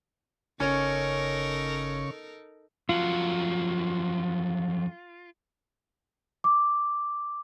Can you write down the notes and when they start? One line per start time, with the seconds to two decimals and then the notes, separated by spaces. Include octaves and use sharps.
0.60 G1 C#3 C#4 D#4 A4 A#4 C#6
2.89 F2 F#3 F4
6.44 D6